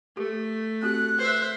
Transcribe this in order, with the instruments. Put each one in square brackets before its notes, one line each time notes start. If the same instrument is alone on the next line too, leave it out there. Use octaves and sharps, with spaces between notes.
[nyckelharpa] A3 [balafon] G4
[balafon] C4 F#4 G4 [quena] F#6
[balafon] B4 [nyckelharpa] C5 E5